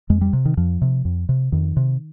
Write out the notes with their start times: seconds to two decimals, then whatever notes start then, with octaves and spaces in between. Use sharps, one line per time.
0.10 F2 G#3
0.21 G3
0.33 C3
0.45 D#3
0.57 F2 F3
0.82 C3
1.05 F2
1.29 C3
1.52 F2 D#3
1.77 C3